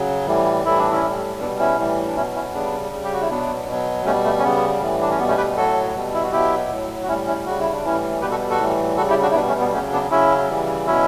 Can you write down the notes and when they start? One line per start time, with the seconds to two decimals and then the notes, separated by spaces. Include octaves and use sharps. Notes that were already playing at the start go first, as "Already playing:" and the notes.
Already playing: C#3 F#3
0.27 A2 E3 G3
0.65 A2 E3 G3 E4
0.78 D4
0.91 C#4 E4
1.02 A2 G3
1.40 B2 B3 D4
1.44 G3
1.59 C#4 E4
1.78 A2 E3 G3
2.07 D4
2.16 B2 F#3 C#4 E4
2.35 C#4 E4
2.53 C#3 G3 B3 D4
2.92 C#3 G3
3.04 G4
3.13 F#4
3.21 E4
3.30 B2 F#3 B3 D4
3.68 B2 F#3
4.05 B2 G3 A3 C#4
4.24 A3
4.39 C#4
4.43 C#3 G3 B3
4.81 A2 E3 G3
5.01 D4
5.10 C#4
5.19 B2 G3 B3
5.28 A3 C#4
5.37 G4 B4
5.57 A2 F#3 F#4 A4
5.95 B2 G3
6.14 E4
6.24 F#4
6.32 B2 F#3 E4 G4
6.70 A2 F#3
7.03 F#4
7.08 A2 G3 C#4 E4
7.27 C#4 E4
7.46 C#3 G3 F#4
7.59 E4
7.72 D4
7.84 A2 E3 G3 C#4 E4
8.21 B2 G3 G4 B4
8.31 F#4 A4
8.50 F#4 A4
8.59 A2 E3 G3
8.97 C#3 G3 F#4 A4
9.10 E4 G4
9.22 D4 F#4
9.31 E4
9.35 B2 G3 B3 D4
9.48 A3 C#4
9.60 B3
9.73 F#3 A3 C#4
9.78 C#3
9.92 B3 D4
10.11 C#3 F#3 C#4 E4
10.49 C#3 E3 G3
10.86 B2 F#3 C#4 E4